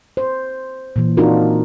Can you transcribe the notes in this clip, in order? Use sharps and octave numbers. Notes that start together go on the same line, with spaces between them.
C5
A#2 E3
C4 D4 D#4 F4 F#4 A#4